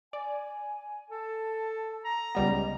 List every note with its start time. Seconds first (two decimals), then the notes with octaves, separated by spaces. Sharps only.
0.13 D5 G#5
1.11 A4 A5
2.05 A#5
2.35 C#2 G3 B3 D#5